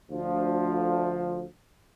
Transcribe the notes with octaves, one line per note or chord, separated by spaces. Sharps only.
D2 F3